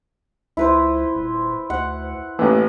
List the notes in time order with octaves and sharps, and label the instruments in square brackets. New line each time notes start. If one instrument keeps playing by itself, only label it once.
[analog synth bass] C#2 [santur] E4 B4 C5
[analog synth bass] D#1
[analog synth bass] D2 [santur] F#5
[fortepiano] A1 E3 [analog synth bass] A#3